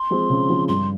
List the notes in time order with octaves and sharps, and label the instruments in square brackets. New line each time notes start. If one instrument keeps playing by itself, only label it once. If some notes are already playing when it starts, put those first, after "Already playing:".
Already playing: [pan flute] C6
[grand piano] F3 G#3 C4
C#3
F3 G#3 C4
[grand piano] G2 [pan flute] C6